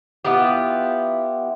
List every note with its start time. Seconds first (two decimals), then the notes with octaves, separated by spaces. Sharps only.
0.25 B3 E4 F4 G4